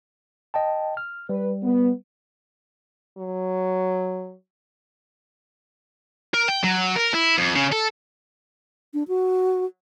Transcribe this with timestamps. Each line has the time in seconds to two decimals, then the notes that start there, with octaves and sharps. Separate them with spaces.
0.54 D#5 G5 A5
0.97 F6
1.29 G3 B4
1.63 B3
3.18 F#3
6.34 A#4
6.48 G5
6.64 F#3
6.96 A#4
7.14 E4
7.38 F2
7.56 C#3
7.72 A4
8.94 D4
9.08 F#4